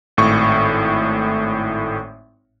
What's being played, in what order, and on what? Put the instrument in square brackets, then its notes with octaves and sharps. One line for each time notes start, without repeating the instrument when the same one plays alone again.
[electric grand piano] G#1 A2 C#6